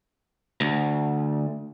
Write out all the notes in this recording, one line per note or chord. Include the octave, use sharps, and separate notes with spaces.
D2